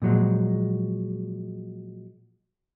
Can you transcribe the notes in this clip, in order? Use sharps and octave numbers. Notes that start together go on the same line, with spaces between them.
A#2 F3 F#3 G#3